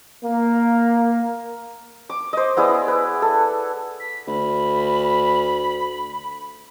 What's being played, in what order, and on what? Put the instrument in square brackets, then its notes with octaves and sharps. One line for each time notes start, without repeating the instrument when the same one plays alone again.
[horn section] A#3
[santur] D6
C5 D#5
B3 E4 G#4 D5
B4
A4
[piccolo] B6
[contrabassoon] D2 [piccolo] B5